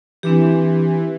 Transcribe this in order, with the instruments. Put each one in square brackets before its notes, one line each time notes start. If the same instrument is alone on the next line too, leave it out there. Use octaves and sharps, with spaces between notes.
[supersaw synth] E3 [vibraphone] C4 D4 G4